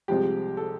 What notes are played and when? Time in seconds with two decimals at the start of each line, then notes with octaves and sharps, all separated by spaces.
0.08 C2 C3 F3 G#3 G4
0.57 A4